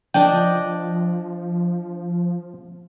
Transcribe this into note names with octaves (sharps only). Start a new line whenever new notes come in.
F3 D4 D5 D#5 G5